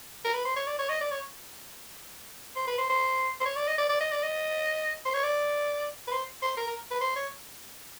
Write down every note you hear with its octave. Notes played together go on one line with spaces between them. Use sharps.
A#4
B4
C5
C#5
D5
C#5
D#5
D5
C#5
C5
B4
C5
C5
C5
C#5
D5
D#5
D5
D5
D#5
D5
D#5
C5
C#5
D5
B4
C5
C5
A#4
A#4
B4
C5
C#5